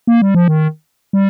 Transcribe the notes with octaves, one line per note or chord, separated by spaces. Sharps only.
A#3
G3
F3
D#3
G3